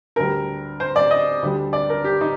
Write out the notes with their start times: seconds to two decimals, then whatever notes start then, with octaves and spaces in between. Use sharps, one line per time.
0.16 D2 D3 G3 A#4
0.80 C5
0.96 D5
1.11 D#5
1.42 D2 D3 G3
1.73 D5
1.90 A#4
2.04 G4
2.21 D#4